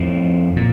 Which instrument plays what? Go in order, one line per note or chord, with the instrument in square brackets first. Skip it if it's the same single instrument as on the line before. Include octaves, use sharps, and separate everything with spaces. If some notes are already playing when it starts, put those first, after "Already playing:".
Already playing: [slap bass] F2 A2
A#2